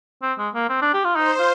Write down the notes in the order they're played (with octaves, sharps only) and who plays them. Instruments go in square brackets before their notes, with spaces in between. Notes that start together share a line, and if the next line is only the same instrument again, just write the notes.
[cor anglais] C4
G#3
A#3
C4
D4
G4
F4
[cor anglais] D#4 [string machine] C5
[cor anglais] F4